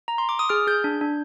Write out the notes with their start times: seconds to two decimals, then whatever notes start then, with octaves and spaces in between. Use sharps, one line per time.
0.08 A#5
0.18 C6
0.29 D6
0.39 D#6
0.49 G#4 F6
0.67 G#4 G6
0.84 D4
1.01 D4